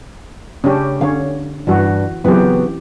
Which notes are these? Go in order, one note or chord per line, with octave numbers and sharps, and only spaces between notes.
C#3 A3 C#4 D4 G4
D3 C#4 C#5 F5
G2 E3 D4 F#4
C#3 E3 F#3 B3 C4 G4